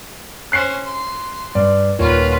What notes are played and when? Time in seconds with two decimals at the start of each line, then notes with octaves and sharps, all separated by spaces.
0.52 C#4 C5 F#6 C7
0.85 C6
1.55 G2 D5
1.99 D#1 F4 A#4 B4 C#5